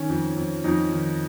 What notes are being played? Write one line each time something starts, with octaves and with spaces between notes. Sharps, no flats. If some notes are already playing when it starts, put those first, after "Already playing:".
Already playing: D#3 C#4
F2
F2
F2 D#4
D#3